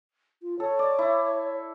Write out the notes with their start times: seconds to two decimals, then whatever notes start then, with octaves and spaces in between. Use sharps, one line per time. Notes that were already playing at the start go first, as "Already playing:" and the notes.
0.43 F4
0.60 A4 C#5
0.79 D5
0.99 E4